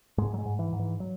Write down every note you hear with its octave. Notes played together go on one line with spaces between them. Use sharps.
G#2 G#3
F#3
G#3
G#2
E3
G#2
E3
F#3